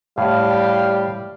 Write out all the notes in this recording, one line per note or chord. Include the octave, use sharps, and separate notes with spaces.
A2 G3 F5